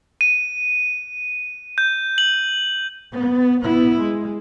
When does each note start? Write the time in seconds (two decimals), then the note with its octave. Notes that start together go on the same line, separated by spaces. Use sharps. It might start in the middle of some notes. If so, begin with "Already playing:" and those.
0.21 D#7
1.78 G6
2.18 F#7
3.13 B3
3.61 B3 E4
4.02 G#3